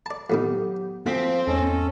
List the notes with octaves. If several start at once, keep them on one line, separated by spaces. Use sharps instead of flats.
D5 A5
F2 A2 D#3 F#3 B3 G4
D2 F3 C4 B6
E2 G#2 G#3 C#4 A4